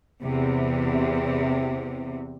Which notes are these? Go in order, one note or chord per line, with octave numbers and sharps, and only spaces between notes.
E2 C3